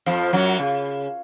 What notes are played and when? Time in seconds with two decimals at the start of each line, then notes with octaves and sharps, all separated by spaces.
0.06 F2 F3
0.33 F#2 F#3
0.59 C#3